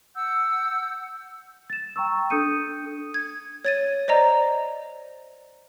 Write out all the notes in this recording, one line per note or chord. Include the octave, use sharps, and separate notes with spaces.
F#5 E6 G6
A6 E7
G5 A#5 C#6 E6
D4 A4 D#6 G6 C#7 D#7
G#6
C#5 A6 D#7
C5 D5 D#5 A#5